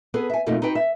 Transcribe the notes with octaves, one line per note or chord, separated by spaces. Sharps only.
B3 G#4 A4 B4
E5 G#5
F2 B2 A3 A#3 D#4
D#4 F#4 B4 G5
E5